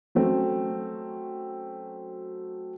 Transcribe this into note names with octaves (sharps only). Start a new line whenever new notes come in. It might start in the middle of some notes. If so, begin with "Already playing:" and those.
F#3 A3 C4 C#4